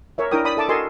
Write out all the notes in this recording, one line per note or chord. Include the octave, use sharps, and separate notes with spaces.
A#4 C#5 E5
D4 E4 A#4 G5 D#6
D5 B5 D#6
A4 E5 A5 D6
F#4 A4 A#4 D#5 G#5 C6